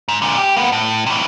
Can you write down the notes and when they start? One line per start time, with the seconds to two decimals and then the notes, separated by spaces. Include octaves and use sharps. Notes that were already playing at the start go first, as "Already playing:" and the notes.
0.09 G#2
0.22 A#2 D3
0.38 G4
0.56 A#3 B3
0.72 A2
1.06 C3 E3